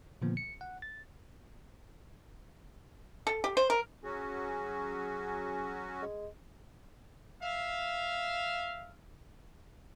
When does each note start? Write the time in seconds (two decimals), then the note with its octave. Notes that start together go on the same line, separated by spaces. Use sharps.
0.22 A#2 D3 D#3 F3 A#3 B3
0.37 C#7
0.61 F#5
0.82 A6
3.27 A4
3.44 G4
3.57 C5
3.70 A#4
4.04 F#3 C#4 F#4 G#4
6.02 G#3
7.41 E5 F5